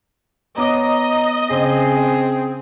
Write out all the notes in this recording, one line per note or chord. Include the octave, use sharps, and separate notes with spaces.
B3 C#5 D#5 A#5 D6
C#3 C4 G#4 C5 D#6